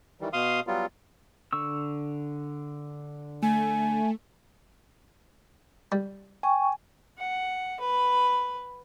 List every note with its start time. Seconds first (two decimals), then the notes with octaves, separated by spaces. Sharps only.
0.21 D#3 E3 G3
0.33 B2 F5 C6 D#6
0.67 F#3 G3 B3 F4
1.53 D3 C#6 E6
3.42 A3 G#5
5.92 G3
6.43 G5 G#5 C#6
7.19 F#5
7.80 B4